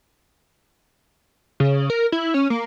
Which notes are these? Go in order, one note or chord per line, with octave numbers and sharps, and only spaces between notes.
C#3
A#4
E4
C#4
A#3